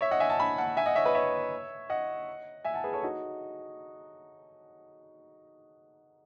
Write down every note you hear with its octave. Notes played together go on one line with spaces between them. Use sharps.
C#5 E5
D#5 F#5
E5 G#5
F#5 A5
G#5 B5
F#5 A5
E5 G#5
D#5 F#5
C#5 E5
B4 D#5
C#5 E5
D#5 F#5
E5 G#5
F#5 A5
G#4 B4
A4 C#5
D#4 F#4